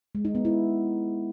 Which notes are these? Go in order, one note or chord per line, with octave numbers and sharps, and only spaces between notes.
G#3
D#4
B3
E4